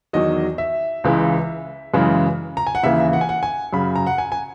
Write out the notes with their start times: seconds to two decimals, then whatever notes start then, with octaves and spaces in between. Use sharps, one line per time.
0.13 E2 D#3 F#3 D#5
0.58 E5
1.04 C#2 C#3 E3 G#3
1.93 F#2 C#3 E3 G#3
2.57 A#5
2.67 G#5
2.75 F#5
2.83 D#2 C#3 E3 E5
3.13 F#5
3.21 G#5
3.29 F#5
3.43 G#5
3.73 F#2 C#3 F#3 B5
3.96 A#5
4.07 F#5
4.18 G#5
4.32 G#5